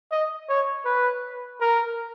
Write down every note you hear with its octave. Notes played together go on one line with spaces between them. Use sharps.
D#5
C#5
B4
A#4